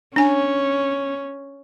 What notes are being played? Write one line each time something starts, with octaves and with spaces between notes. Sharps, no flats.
C#4 D4 G#5